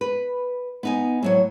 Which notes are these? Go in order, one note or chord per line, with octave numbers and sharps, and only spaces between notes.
B4
B3 D#4 G#5
A2 F#3 C#5